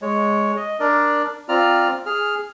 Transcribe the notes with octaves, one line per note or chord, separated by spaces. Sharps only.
G#3 C#5
D#5
D4 A#4 D5
C4 F4 D5 A#5 F6
G#4 F6